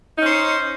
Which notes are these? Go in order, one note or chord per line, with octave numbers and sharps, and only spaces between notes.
C#4 D#4 C5